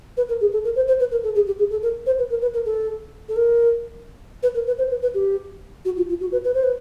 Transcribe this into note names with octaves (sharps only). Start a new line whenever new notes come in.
B4
A#4
G#4
A4
A#4
C5
C5
B4
A#4
A4
G#4
G4
G#4
A4
A#4
C5
B4
A#4
B4
A#4
A4
A4
A#4
B4
A#4
B4
C5
B4
B4
G4
F#4
F4
F4
F#4
B4
B4
C5
B4